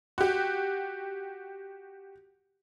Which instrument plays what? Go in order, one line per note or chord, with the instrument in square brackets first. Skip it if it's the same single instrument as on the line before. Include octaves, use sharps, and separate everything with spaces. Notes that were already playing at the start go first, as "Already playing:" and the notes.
[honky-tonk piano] F#4 G4